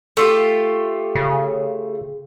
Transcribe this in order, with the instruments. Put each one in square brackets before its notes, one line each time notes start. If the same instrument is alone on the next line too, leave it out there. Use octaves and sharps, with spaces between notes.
[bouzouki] A3 F4 G4
[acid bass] C#3